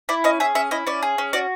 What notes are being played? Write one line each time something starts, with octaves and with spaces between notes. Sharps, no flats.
E4 D5
C#4 D#5
G#4 E5
C#4 E5
E4 D#5
C#4 D5
G#4
C#4
F#4 D5